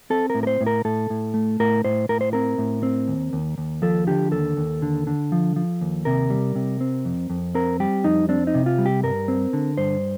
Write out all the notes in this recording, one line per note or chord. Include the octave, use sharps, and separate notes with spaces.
C4 A4
A#4
A2
A#4
C5
A2
A#4
A2 A4
A2
A3
A2 A#4
A2 C5
A2 A#4
C5
C4 A#4
A2
C4
D#2
D#2
D#2
F3 A4
D3 G4
D#2 A4
D#2
D3
D3
F3
F3
D#2
C3 A#4
G3
C3
C4
F2
F2
C4 A#4
G3 G4
F2 D#4
C4 D4
D#4
C3
F4
G3
G4
G2 A#4
C4
D3
G2 C5